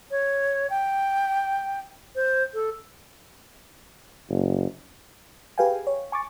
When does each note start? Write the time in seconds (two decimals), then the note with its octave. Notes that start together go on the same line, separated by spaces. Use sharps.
0.11 C#5
0.70 G5
2.15 C5
2.54 A4
4.30 F#1
5.58 G4 G#4 B4 F5 G5 G#5
5.87 C#5
6.12 G#5 C#6 D6 A6